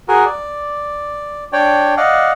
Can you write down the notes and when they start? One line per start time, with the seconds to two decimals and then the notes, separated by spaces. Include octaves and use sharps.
0.08 F#4 G#4 A#4
0.26 D5
1.53 D4 C#5 D5 G5
1.97 D5 D#5 F5 F#5